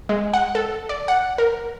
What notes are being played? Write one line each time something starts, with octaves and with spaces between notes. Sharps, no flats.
G#3
F#5
A4
D5
F#5
A#4